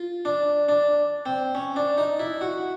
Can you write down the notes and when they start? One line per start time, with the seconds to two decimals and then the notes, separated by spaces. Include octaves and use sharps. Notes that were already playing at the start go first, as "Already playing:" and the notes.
Already playing: F4
0.25 D4
0.69 D4
1.26 C4
1.55 C#4
1.76 D4
1.98 D#4
2.20 E4
2.41 F#4